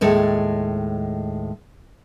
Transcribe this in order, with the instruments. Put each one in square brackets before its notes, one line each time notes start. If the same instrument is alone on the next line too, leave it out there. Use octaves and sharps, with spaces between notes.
[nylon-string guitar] D#2 A2 G#3 A4